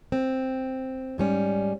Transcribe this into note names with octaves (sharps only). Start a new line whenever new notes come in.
C4
G#2 G3 C#4